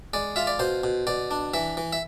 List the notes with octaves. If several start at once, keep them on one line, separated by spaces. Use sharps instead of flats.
G#3 D5
F4 E5
D5
B2 C5
B2
B2 D5
D4
E3 E5
E3
E5